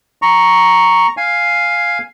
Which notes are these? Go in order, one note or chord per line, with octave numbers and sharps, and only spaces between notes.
A#5 C#6
F5 G#5